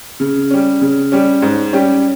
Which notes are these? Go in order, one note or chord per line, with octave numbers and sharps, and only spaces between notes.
C#3
G3 C#4
C#3
G3 C#4
G#2
G3 C#4 G4